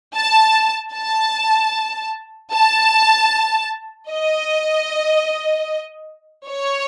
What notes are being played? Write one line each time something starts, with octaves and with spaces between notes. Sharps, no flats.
A5
A5
A5
D#5
C#5